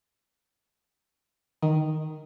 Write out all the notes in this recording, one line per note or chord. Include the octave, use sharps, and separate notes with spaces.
D#3